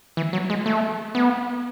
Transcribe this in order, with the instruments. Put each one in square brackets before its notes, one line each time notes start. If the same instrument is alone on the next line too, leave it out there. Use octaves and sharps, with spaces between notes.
[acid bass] E3
F#3
G#3
A3
B3